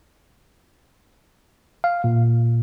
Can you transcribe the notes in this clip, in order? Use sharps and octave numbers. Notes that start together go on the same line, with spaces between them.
F5
A#2